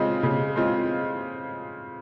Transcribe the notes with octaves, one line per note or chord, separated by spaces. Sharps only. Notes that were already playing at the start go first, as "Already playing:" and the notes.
Already playing: C#3 G#3 C4 F4
C#3
G#3 C4 F4